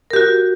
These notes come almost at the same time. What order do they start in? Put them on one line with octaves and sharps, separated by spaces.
A#4 G4 F#4